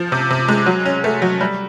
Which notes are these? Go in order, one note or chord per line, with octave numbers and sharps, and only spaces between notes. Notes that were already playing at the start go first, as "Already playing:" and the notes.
Already playing: F3
C3
C3
G#3
F#3
C#4
A3
F#3
G3